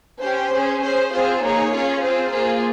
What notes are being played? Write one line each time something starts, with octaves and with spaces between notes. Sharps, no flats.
C#4 G4 C5
C#4 G#4
C#4 G#4 C5
C4 F4 G#4 C5
A#3 D#4 G#4 C#5
C#4 F4 G#4
C4 F4 G#4 C5
A#3 F4 G#4